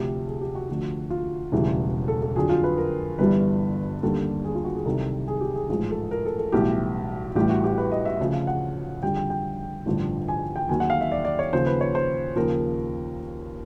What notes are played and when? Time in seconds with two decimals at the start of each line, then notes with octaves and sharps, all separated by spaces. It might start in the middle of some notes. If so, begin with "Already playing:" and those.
Already playing: D2 C3 F3 G4
0.27 G#4
0.41 G4
0.55 F#4
0.69 D2 D3 F3
1.10 F4
1.52 E1 D2 C#3 E3 G3
2.08 A4
2.22 A4
2.36 F2 D3 F#3 G#4
2.49 F4
2.64 B4
2.78 A#4
3.19 G1 G2 E3 G3 B4
4.03 D#2 D3 G3 A4
4.44 G#4
4.55 F4
4.64 F#4
4.75 G#4
4.85 C2 C3 D#3 F#3 A4
5.28 G#4
5.41 G4
5.55 G#4
5.69 A1 G#2 F3 G#4
5.91 A4
6.11 A#4
6.25 A4
6.38 A4
6.52 B1 A2 E3 G3 G4
7.36 A1 A2 E3 G3 G4
7.49 F#4
7.64 G4
7.78 B4
7.92 D#5
8.05 E5
8.19 D2 C#3 F3
8.33 F5
8.47 F#5
9.02 F2 D3 G3 G5
9.17 G5
9.30 G5
9.86 A1 G2 D3 F3
10.28 G#5
10.56 G5
10.69 D#2 D#3 F#3 G#5
10.80 F#5
10.90 F5
11.01 E5
11.12 D5
11.25 D5
11.39 C#5
11.53 D#2 C#3 F3 C5
11.66 B4
11.81 C#5
11.95 C5
12.36 D#2 C#3 F3 A#4